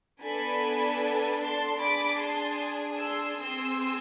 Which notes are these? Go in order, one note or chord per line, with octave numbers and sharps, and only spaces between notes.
B3 D4 A4 G#5 B5
A5 C6
D4 G#4 B5 D6
A5 C6
C6 E6
C4 G#4 C6 E6